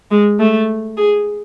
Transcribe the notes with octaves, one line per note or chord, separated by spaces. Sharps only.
G#3
A3
G#4